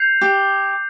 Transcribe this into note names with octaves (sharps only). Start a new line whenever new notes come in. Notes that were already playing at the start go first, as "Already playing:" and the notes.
Already playing: G6 C7 F7
G4